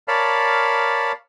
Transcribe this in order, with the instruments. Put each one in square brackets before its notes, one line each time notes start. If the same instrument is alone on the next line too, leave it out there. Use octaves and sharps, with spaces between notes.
[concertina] A#4 C#5 D5 F5 A5 B5